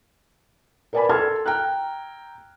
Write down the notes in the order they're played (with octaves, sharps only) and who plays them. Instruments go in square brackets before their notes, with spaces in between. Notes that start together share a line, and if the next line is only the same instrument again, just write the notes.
[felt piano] A#4 B4 D5 G#5 A5 B5
A4 A5 C6 F6 G#6
G5 A#5 F6 F#6